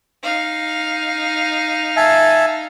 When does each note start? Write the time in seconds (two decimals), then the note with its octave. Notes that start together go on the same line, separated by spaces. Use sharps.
0.23 D#4 F5
1.96 E5 G#5 A5